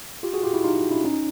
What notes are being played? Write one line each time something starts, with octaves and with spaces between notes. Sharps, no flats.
F4 G4
F#4 G#4
F4 G4
E4 F#4
D#4 F4
D4 E4
C#4 D#4